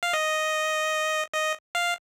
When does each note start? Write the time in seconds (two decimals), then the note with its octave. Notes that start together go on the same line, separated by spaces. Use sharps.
0.03 F5
0.13 D#5
1.34 D#5
1.75 F5